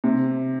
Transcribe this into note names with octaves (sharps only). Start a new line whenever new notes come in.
C3